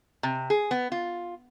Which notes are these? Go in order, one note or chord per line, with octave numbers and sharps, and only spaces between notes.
C3
G#4
B3
F4